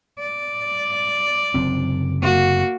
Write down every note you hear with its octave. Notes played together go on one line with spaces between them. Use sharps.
D5
F#1 C3 C4
A#3 F#4